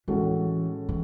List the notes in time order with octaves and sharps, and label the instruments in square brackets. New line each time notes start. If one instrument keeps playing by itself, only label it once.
[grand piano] A2 G#3 C#4 F#4 A4 [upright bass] E3
[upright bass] E3